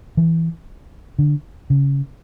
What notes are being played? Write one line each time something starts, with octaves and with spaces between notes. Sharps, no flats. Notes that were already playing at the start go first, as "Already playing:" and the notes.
E3
D3
C#3